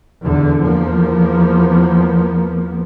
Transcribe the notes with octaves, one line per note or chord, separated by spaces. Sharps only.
E2 D3
E2 F3 A#3 B3